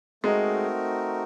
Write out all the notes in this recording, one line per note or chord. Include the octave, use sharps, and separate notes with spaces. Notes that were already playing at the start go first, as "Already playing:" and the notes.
G#3 A3 C4 D#4 F#4 A#4